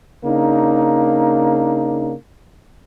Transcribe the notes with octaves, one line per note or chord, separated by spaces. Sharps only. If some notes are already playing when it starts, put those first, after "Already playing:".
C#3 A#3 D4 D#4